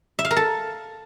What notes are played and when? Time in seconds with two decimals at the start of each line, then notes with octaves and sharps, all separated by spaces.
0.19 E5
0.25 F5
0.31 A#4
0.36 A4